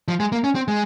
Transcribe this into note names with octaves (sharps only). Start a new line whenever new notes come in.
F3
G#3
A#3
C#4
C4
G#3